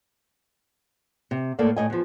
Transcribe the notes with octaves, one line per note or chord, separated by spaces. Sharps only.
C3
A2 A#3 A4 D5
A2 D#5 G#5
E2 F3